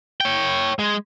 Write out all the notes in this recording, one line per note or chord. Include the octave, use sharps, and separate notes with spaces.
C#5 G5
G#3